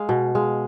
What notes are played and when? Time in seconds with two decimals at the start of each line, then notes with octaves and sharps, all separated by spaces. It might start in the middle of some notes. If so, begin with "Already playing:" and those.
Already playing: G#3 F5
0.09 B2
0.35 G#3 F5